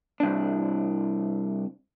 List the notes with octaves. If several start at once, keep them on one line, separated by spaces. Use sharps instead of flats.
C2 D4